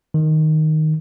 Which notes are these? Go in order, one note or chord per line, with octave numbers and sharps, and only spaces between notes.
D#3